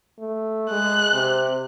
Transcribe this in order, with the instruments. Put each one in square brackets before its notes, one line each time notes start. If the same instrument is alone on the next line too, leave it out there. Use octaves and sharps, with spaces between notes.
[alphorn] A3
[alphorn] G#3 [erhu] F#6
[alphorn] C3